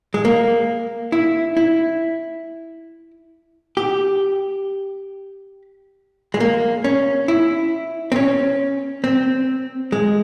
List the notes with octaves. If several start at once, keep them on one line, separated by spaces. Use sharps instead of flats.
G#3
A#3
E4
E4
G4
G#3
A#3
C#4
E4
C4
C#4
C4
G#3